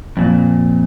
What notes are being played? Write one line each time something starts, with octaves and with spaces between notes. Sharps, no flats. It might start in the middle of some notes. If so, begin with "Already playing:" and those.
F2 A#2